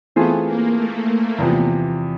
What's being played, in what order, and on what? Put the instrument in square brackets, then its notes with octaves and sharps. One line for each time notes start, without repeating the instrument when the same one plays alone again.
[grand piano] E3 A3 C4 F4 G#4 [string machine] B3
[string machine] A#3
A3
A#3
[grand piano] E2 C3 F3 [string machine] B3